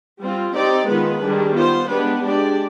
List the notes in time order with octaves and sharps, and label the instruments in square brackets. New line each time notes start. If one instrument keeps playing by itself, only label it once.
[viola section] G3 C4 F4
C4 D#4 G4 D5
D#3 G#3 B3 F4 B4
D#3 G3 D4 G#4
B3 F4 C5
G#3 B3 D4 G4 B4
G#3 D4 G4 D5